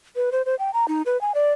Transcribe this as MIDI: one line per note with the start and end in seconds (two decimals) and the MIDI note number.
0.16 0.30 71
0.32 0.42 72
0.46 0.55 72
0.59 0.70 79
0.74 0.88 82
0.88 1.02 63
1.06 1.19 71
1.21 1.32 80
1.35 1.52 74